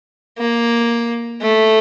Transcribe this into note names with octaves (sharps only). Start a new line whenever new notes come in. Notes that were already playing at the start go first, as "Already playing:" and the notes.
A#3
A3